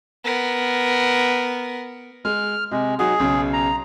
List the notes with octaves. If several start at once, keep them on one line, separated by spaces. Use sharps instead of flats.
B3 A#4
G#3 F6
C3 G#3
F#3 D#4 F#4 G#4
B1 C#3
A#5